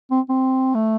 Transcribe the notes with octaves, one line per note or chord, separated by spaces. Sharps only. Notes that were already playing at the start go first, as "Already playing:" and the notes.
C4
C4
A3